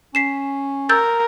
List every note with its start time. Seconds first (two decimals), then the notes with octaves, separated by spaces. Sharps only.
0.15 C#4 B6 C7 E7
0.89 A#4 E6 G6 A6